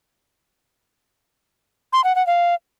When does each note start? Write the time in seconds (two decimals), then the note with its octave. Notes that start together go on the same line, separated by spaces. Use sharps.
1.93 C6
2.04 F#5
2.15 F#5
2.27 F5